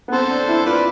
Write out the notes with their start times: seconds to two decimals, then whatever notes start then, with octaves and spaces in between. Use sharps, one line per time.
0.08 B3
0.12 C4 A4 C5
0.30 D4
0.48 E4
0.65 F4 B4 D5